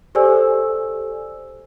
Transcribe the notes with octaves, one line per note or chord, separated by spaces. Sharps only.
G4 A4 C5 D5 G#5 E6